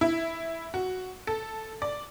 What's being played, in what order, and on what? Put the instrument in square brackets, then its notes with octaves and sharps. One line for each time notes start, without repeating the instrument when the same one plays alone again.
[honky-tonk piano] E4
F#4
A4
D5